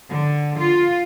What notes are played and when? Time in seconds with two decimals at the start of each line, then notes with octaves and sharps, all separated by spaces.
0.11 D3
0.59 F4